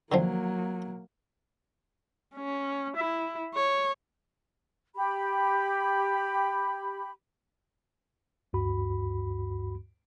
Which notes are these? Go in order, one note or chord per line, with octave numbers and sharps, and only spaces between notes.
D3 D#3 F3 F#3 A#3
C#4
E4
C#5
G4 B5
D2 G2 F#4 B5